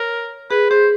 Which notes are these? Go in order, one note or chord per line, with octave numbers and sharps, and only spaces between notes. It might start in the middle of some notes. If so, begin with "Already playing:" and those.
Already playing: A#4 C#5
G#4 B4
G#4 C5